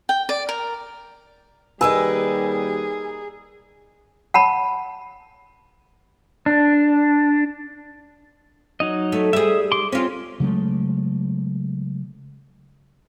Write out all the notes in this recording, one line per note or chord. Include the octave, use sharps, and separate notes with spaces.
G5
D5
A#4
D#2 G3 D#4 G#4 A#4 B4 G#5 E6
F#5 A5 B5
D4
F#3 D#4 D#5
A3
G3 G#4 E5 D#6
C6 D6
C4 C#4 F4
C#3 F#3 G#3 A3